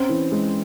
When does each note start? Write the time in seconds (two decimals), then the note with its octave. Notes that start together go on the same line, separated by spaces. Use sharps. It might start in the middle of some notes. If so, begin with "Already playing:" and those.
Already playing: C4 C#4
0.09 E3
0.32 G#3